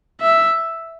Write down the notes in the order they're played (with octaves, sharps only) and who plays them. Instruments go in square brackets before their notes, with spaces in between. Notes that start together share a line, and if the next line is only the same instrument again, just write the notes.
[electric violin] E5